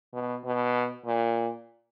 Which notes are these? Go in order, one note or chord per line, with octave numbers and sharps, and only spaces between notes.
B2
B2
A#2